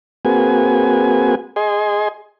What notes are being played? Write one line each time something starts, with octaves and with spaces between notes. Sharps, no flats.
A#3 C4 F#4 G#4 B4 G#5
G#4 D#5 G#5 C6